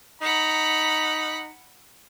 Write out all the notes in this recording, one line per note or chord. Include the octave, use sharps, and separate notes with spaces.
D#4 F#5 A#5 B5